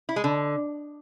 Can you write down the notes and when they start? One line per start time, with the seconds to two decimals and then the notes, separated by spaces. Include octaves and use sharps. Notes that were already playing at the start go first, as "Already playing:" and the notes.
0.09 E4
0.16 G#3
0.24 D3